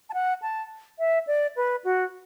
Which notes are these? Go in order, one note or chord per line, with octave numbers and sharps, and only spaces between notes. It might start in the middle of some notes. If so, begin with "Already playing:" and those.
A5
F#5
A5
E5
D5
B4
F#4